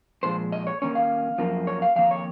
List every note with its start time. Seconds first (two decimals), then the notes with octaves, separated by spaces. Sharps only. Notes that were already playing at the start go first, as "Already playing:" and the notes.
0.23 A#2 F3 G#3 C5
0.52 D#5
0.67 C#5
0.82 D#3 A#3 C#4 C#5
0.95 F5
1.38 F#2 F3 A#3
1.67 C#5
1.82 F5
1.96 F2 D#3 A#3 F5
2.11 C#5